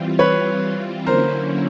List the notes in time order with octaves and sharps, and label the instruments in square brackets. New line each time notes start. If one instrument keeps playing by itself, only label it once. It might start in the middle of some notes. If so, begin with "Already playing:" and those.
Already playing: [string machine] E3 G3 C4 F4
[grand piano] B4 C#5
[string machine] D3 F#3 A#3 C#4 E4 [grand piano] A#4 C5